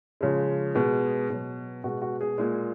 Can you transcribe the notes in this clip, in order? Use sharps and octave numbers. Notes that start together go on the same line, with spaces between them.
C#3 F3 G#3
B2 G#3
B2 F#3
B2 G#3 F#4
F#4
G#4
A#2 G#3